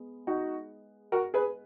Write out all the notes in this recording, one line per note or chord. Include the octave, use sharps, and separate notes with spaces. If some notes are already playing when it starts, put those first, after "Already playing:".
Already playing: G#3 B3
D#4 F#4
F#4 A#4
G#4 B4